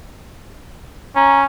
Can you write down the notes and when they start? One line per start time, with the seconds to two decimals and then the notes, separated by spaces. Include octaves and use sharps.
1.16 C#4 A#5